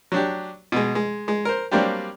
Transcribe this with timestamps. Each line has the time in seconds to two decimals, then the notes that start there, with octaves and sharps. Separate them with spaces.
0.12 F#3 D4 G4
0.72 B2 G#3
0.95 G#3
1.28 G#3
1.45 A#4 C5
1.72 F#3 G3 A#3 C4 D4 G4